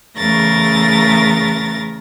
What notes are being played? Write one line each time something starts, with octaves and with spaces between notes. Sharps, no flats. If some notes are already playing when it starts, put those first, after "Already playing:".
E2 C#3 A3 A#4 A6 A#6